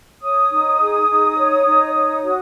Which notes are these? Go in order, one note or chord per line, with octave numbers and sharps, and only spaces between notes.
C#5 D#6
D#4
G#4
D#4
C#5
D#4
C#5
F#4